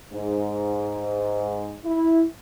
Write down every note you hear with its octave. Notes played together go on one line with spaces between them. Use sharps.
G#2
E4